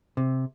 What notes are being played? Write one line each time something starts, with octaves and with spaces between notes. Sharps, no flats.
C3